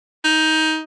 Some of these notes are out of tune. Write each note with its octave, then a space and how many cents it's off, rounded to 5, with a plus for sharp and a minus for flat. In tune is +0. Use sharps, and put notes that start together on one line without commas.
D#4 +15